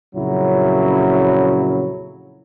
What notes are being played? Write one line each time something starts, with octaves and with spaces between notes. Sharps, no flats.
F2 A#2 C#3 F#3 C#4 E4